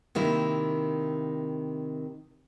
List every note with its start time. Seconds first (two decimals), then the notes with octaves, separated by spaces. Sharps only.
0.15 C3 D#3 A#3 E4